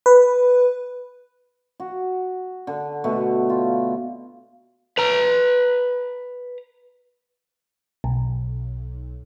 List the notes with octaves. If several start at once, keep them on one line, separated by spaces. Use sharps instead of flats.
B4
F#4
D3
B2 A3
F4
B4 A#5
B1